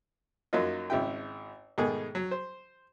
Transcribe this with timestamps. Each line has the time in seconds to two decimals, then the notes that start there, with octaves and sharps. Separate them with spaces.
0.53 F#2 F#3 A#3 D#4 F4
0.90 G#1 C#3 E4 G5
1.78 G#2 B2 D#3 A3 G#4
2.15 F#3
2.31 C5